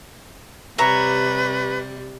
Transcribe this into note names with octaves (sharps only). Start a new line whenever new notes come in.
C3 G3 B4 C#5 E5 A#5